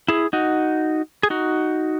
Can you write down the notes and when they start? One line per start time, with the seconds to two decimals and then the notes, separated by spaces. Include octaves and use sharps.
0.08 E4 G#4
0.33 D#4 F#4
1.23 G#4
1.30 D#4 F#4